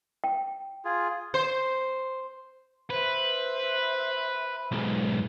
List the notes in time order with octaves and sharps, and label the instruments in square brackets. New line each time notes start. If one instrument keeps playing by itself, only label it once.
[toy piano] G5
[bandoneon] F4 G#4
[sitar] C5
[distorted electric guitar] B4 [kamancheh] C5 E5
[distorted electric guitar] B1 G#2